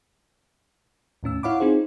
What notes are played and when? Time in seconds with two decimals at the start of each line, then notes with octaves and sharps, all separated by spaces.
1.23 D#2 A2 C#4 E6
1.43 E4 C#5 F5 F#5 B5 D6
1.60 C4 D#4 F4 G#4 C5